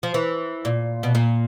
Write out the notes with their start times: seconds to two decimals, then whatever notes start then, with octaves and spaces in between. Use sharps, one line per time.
0.03 F3
0.14 E3
0.65 A#2
1.03 B2
1.15 A#2